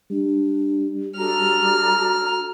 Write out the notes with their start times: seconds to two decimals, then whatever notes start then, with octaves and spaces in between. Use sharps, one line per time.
0.11 G3 D4
1.17 D4 F#4 A4 A#5 F6
2.00 F#4